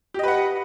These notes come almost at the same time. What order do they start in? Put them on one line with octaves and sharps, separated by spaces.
G4 D#5 B4 F#5